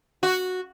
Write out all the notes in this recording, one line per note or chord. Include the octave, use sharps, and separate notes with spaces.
F#4